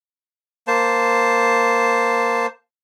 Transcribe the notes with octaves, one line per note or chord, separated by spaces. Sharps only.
A#3 C5 A5